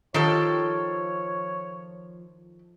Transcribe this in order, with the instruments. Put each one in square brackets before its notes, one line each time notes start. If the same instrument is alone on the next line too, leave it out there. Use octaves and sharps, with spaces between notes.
[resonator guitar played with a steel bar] D#3 G4 A4 [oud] F3 [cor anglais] C#5